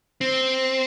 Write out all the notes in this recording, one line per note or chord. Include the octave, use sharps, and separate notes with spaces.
C4